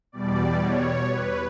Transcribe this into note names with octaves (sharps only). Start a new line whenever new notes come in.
E2 B2 G3 D5
C#5
B4